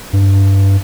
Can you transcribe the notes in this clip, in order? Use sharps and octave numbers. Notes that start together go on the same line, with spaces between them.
G2